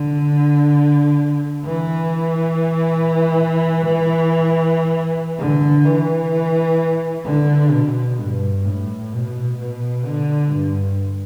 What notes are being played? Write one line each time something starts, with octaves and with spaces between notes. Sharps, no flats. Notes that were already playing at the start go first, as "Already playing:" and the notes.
Already playing: D3
E3
D3
E3
D3
B2
G2
A2
B2
B2
D3
G2